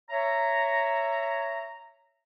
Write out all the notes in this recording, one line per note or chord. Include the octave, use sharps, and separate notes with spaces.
C#5 E5 A#5